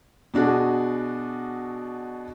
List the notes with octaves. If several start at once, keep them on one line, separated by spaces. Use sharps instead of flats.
B2 D4 F#4 G#4